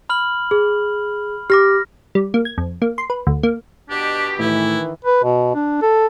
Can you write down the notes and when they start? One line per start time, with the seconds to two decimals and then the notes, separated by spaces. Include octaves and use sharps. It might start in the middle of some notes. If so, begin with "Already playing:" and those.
0.09 B5 F6 F#7
0.51 G#4
1.50 G4 D6 F6 A#6
2.15 G3
2.34 A#3
2.45 G#6
2.58 F2
2.82 A#3
2.98 C6
3.10 B4
3.27 D2
3.43 A#3
3.90 B2 D4 G4
4.39 A2 D#3 E3 E4
5.04 B4
5.23 B2
5.55 D4
5.82 A4